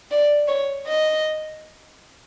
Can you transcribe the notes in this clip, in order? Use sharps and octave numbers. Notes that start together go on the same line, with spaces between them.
D5
C#5
D#5